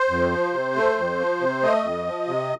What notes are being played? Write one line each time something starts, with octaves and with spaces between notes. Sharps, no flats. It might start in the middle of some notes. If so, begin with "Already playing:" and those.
Already playing: C5
F2
F3
C3
A3
F2
F3
C3
A3 D#5
F2
F3
C3